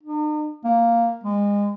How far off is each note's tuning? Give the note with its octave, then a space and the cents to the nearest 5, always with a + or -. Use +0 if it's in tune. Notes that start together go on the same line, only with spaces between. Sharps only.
D#4 -45
A#3 -5
G#3 -30